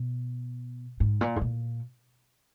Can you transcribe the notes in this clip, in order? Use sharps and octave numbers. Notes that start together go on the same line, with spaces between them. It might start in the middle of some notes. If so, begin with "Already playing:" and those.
Already playing: B2
G#2
A#2
G#2
A#2